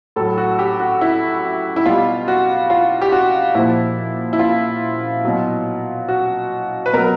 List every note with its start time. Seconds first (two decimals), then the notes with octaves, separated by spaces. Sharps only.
0.16 A2 F#3 A4
0.38 F#4
0.59 G4
0.80 F#4
1.01 E4
1.76 E4
1.86 B2 G3 F4
2.28 F#4
2.70 F4
3.02 G4
3.12 F#4
3.55 A#2 F3 E4
4.33 E4
4.39 F4
5.24 B2 F#3
6.09 F#4
6.86 B4
6.93 B2 F#3 A#4